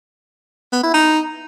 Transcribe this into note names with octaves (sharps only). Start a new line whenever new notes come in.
B3
E4
D#4